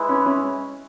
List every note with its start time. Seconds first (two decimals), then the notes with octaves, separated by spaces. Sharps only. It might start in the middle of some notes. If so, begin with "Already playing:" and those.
Already playing: G#3 E4 B4
0.09 C#4
0.26 C#4